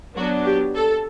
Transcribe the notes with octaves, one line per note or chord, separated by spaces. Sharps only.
F#3 B3 D4 F#4
G4
A4